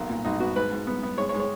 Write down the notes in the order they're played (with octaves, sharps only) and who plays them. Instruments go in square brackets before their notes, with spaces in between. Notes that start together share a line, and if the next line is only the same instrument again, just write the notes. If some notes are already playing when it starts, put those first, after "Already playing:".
Already playing: [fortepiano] B1 A#3
A#2
B1 D#4
B3 F#4
G#2 B4
G#2
B3
B3
G#3 C#5
C#5
G#3
C#5